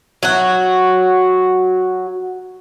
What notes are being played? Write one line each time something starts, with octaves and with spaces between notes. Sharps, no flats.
F#3 F#4